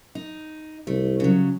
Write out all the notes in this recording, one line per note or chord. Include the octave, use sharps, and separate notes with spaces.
D#4
C2 A3
C#3 F#3